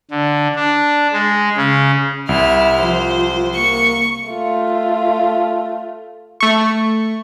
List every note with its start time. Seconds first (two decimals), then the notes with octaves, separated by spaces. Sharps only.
0.11 D3
0.55 D4
1.13 G#3
1.57 C#3
2.29 C2 E4 F6
2.81 F3 C5
3.55 A#3 C#6
4.28 A3 F4
6.40 A3 C#6